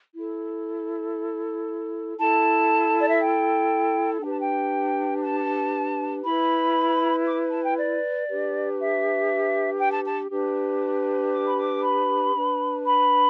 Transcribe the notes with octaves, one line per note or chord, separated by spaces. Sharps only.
E4 A4
E4 A4 A5
D5
E5
G5
D4 G4 B4 G5
A5
G5
A5
E4 B4 B5
D6
A5
G5
D5
D4 G4 B4
E5
G5
A5
A5
D4 G4 B4
D6
B5
D6
B5
D4 B4
B5